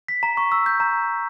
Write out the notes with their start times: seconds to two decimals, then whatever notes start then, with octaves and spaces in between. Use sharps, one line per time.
0.08 B6
0.23 A#5
0.37 C#6
0.52 E6
0.66 G6
0.80 A#5